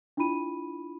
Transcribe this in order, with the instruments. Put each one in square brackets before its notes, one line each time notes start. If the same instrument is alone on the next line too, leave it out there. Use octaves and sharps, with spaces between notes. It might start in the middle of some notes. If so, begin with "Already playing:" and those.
[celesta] D4 E4 F4 B5 D#7